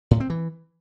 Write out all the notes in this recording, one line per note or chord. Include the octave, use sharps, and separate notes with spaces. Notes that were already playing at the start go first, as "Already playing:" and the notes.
A2
C4
E3